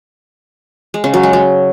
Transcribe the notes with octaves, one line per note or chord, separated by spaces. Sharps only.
G#3
C#3
F#3
G#3
F#3